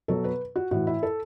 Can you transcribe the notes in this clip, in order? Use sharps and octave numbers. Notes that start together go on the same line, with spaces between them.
B2 F#3 A4
B4
F#4
A2 E3 F#4
E4
A4